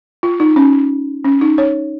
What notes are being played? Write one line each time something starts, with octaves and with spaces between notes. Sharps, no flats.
F4
D#4
C#4
C#4
D#4
C#5